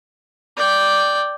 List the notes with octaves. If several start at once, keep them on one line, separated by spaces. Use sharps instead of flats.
D5 G5